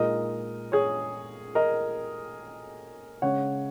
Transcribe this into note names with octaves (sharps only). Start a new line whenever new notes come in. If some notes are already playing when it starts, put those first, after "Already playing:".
Already playing: A#2 G#3 D#4 A#4 D#5
G#4 C#5
A#4 D#5
C#3 G#3 C#4 C#5 F#5